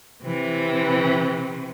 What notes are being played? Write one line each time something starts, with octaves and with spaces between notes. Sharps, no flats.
C3 E3